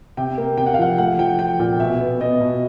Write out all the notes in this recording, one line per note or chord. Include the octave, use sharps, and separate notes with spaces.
C3 G5
A#3
C3 G5
F#5
F5
F3 F#5
A3 F#5
F3 G5
F3 G5
A#2
B2 E5
B3
B3 D#5
B2